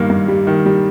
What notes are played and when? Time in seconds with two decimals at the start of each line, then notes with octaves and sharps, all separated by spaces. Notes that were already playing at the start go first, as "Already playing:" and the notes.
Already playing: G2 D#3 A#3
0.10 G2
0.28 G3
0.47 D#3
0.66 G3